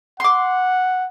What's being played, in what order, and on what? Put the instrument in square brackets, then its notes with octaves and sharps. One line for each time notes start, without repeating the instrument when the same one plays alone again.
[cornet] F#5 [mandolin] C6 D6